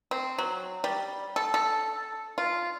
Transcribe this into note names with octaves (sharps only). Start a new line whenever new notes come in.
C4
F#3
G3
A4
A4
F4